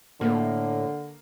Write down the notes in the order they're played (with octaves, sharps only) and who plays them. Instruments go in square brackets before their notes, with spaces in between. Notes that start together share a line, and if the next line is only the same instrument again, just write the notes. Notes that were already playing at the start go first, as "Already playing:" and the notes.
[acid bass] A2 [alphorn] D3 [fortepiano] A#3